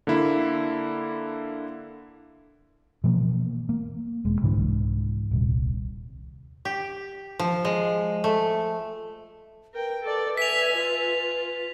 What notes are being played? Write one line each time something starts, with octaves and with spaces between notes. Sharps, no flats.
D3 A#3 E4
B2 E3 F3 A#3
A#3
E1 G#3
C2 G#2 D3 E3
D#1 C2
G4
F3
G#3
A3
A#4 B4 G5
A4 D5
E5 G#5 B6 F7
F4